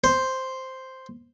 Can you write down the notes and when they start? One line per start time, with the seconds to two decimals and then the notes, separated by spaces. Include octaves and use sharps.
0.04 C5